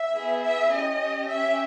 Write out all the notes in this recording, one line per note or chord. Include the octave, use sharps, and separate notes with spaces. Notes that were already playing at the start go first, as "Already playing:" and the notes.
Already playing: E5
B3 E4 G#4
E5
C#4 G4 D#5
C#4 G4 E5